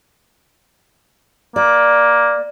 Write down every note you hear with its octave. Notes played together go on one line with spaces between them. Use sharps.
A#3 D5